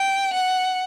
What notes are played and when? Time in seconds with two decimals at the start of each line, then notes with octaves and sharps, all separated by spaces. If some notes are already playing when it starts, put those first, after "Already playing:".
Already playing: G5
0.33 F#5